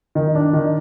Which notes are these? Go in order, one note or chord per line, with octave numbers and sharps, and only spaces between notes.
D#3
D4
D#3